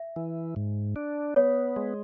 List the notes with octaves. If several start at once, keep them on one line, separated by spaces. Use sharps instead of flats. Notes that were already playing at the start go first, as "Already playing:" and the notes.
Already playing: E5
E3
G#2
D4
B3 C#5
G#3